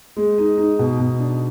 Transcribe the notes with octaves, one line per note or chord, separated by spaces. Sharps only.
G#3
D#4
D#4
B2
B2
D4